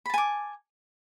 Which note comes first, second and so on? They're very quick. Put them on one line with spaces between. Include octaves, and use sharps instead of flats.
B5 A5 G#5 D6